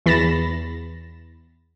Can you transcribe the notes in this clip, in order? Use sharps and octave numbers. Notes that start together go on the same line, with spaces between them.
E2 B5 A6 A#6 E7